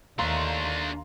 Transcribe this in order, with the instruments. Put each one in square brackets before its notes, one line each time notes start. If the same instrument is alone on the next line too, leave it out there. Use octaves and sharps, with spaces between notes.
[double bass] D#2 [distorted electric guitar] A3 D4 [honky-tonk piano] F5 A#5 C6